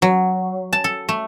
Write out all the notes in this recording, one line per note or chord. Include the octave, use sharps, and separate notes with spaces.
F#3
A5
A4
A3